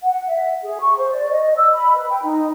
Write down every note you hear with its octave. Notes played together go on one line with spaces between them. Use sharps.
F#5
E5
G#4
C#6
C5
D5
D#5
E6
B5
B4
G5
D#4